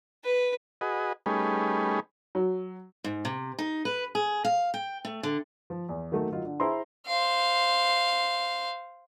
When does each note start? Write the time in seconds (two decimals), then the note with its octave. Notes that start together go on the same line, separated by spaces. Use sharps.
0.24 B4
0.81 F#4 G#4 B4 D#5
1.26 G3 A3 C#4 D#4 G#4 B4
2.35 F#3
3.04 G#2
3.25 C3
3.59 D#4
3.85 B4
4.15 G#4
4.45 F5
4.74 G5
5.05 A3
5.23 D3
5.70 F3
5.89 E2
6.12 D#3 F#3 A3 A#3
6.32 D#3 F#3 D#4 F4
6.45 D3
6.60 E4 G#4 C5 A#5 C6
7.06 C5 F5